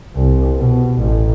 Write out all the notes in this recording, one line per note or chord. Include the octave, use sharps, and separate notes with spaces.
C2
B2
A1